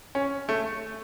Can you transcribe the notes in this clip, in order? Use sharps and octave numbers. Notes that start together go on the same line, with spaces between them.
C#4
A3